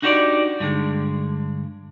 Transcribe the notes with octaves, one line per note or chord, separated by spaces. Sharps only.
D4 D#4 F#4 G4 C5 D5
G2 D3 G#3